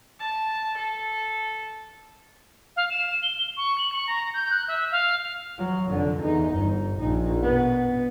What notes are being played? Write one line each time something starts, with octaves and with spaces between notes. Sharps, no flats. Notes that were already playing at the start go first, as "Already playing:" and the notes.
A5
A4
F5
E7
G7
C#6
F#7
C#6
A#5
G6
F#6
E5
F5
F#3
F1 D3
E2 D#4
G1
A#1 D#4
B2 B3